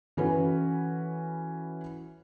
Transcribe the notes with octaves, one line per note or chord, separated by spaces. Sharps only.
E3 C#4 F#4 A4 B4